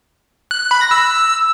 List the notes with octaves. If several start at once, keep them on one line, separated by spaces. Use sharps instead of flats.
F#6
F#6
B5
A#6
E6